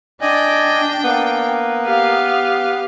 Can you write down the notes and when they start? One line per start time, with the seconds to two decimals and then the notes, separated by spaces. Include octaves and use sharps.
0.22 D4 D5 D#5 G5 G#5
1.04 A#3 B3
1.86 G4 F5